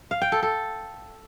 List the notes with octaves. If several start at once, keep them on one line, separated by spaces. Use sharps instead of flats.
F5
G5
A4
A4